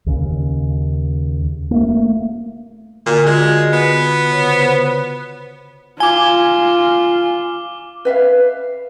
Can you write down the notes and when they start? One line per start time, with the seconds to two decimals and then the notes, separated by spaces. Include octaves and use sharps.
0.06 D#2 C#3
1.71 A3 A#3
3.06 A#2 D3 F#4 G#5
3.26 G#3 F4
3.73 B3
4.30 C#3 C#5
4.49 C5
6.00 F4 G#5 D6 G7
8.05 B4 E5 F5